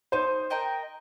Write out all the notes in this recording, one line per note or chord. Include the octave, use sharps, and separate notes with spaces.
D#4 C5
A#4 D#5 G5